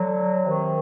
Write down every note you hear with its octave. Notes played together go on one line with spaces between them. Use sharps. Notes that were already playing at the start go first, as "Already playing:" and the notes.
Already playing: D3 F#3
C3 D#3